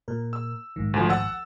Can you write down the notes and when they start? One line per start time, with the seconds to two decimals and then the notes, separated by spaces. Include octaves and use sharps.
0.08 A#2 A#4
0.33 E6
0.76 A#1 G#2 D#3
0.94 D2 F3
1.09 F#5 E6 A6